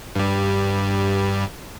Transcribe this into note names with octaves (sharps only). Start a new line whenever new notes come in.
G2 G3